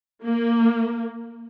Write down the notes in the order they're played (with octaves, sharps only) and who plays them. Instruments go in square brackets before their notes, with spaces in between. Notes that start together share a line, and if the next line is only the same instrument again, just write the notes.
[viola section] A#3